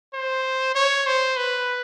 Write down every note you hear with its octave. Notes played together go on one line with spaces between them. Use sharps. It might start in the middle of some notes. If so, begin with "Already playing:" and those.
C5
C#5
C5
B4